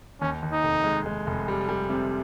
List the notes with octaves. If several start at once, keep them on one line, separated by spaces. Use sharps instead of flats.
D#2 C#4
D#2
D#4
F1
G#3
G#3
F1
G3
G3
C3